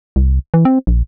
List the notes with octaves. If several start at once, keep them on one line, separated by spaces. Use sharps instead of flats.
C2
E3
C4
A#1